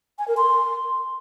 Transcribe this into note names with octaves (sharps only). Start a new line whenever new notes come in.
G#5
A#4
C6